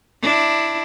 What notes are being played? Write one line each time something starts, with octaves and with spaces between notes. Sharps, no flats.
D4 E4